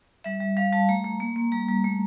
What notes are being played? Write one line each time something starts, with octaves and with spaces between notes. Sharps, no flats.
G3 E5
G3
G3 F5
G3 A5
A3 A#5
A3
A#3
A#3
G3 A#5
G3
A3